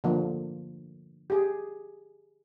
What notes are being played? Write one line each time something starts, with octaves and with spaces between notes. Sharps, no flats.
D3 F3 A#3
G4 G#4